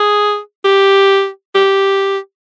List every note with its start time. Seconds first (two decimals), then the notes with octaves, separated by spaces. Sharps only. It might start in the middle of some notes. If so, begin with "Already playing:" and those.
Already playing: G#4
0.64 G4
1.55 G4